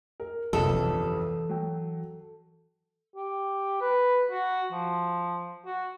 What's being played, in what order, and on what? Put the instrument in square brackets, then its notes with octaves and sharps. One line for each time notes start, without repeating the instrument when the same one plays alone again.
[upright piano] A#4
[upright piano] G1 C2 F2 [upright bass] C3 [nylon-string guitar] A4
[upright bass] E3
[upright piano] F#3 G5
[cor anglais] G4
B4
F#4
F3
F#4